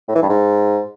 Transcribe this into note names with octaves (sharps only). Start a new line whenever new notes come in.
A2
E3
G2
G#2